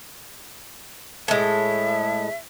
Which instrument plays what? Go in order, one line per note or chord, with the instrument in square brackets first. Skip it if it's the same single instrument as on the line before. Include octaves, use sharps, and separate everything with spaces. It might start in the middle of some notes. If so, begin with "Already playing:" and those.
[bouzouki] A2 G#3 [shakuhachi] E5